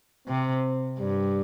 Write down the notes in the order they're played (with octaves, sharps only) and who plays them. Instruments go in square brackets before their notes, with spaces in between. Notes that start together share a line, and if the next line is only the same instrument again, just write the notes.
[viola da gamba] C3 [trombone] C4
[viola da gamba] G2 [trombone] G3